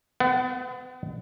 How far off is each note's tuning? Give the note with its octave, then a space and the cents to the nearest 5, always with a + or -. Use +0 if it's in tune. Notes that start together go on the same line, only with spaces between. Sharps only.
B3 +40 F#5 +0